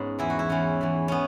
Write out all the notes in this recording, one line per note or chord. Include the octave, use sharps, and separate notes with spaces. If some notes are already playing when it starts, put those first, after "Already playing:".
Already playing: G#2 B3 C#4 F#4
E2 E3 E4
F#4
E4
E2 E3 C#4
E2 E3
B3 C#4